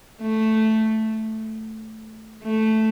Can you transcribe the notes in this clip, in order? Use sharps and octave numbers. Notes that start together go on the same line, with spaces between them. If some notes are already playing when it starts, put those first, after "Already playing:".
A3
A3